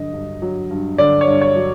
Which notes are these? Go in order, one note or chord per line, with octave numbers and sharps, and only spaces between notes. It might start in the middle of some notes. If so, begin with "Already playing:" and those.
Already playing: G2 D3 F#3 D#5
G2
F#3
G2
D3 D5
C#5
G2
C#5
F#3